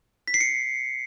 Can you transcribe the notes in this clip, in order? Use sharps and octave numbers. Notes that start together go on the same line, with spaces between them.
B6
C7
C#7